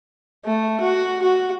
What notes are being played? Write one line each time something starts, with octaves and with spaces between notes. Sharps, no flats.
A3
F#4
F#4